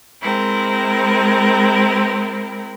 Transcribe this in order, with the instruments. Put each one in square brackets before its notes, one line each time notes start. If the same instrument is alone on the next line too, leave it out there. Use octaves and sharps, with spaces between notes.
[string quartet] G#3 C4 E4 A#4